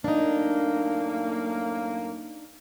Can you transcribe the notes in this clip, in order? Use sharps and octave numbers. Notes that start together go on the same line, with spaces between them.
F#2 A2 A#3 D4 D#4